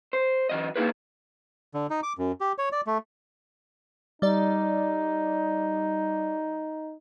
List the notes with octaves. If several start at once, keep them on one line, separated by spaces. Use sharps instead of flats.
C5
E3 F#3 D#5
A#3 D#4 E4 G#4 B4
D3
D#4
D6
F#2
G4
C#5
D5
A3
G3 D#4 D5